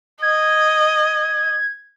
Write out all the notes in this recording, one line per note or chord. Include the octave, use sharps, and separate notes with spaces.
D#5 G#6